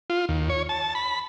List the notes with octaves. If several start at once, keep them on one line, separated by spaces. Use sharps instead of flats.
F4
D#2
C#5
A5
B5